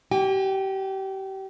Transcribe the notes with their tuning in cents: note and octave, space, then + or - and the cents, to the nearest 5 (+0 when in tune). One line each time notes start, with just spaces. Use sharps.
G4 -30 G5 +45